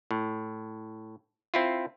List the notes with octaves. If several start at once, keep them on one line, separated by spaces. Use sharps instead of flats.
A2
C4 E4 F4